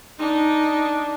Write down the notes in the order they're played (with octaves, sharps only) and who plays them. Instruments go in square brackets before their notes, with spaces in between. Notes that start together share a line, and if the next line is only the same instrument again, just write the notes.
[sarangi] D4 [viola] D#4